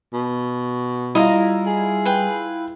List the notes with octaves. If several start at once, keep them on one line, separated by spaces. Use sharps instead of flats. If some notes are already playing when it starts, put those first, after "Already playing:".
B2
G3 E4 F4 D#5 F5 A#5
G#4
B4 G5